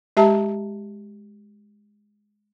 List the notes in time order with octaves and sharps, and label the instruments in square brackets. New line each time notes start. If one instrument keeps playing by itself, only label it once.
[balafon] G#3 G4 E5 A5 A#5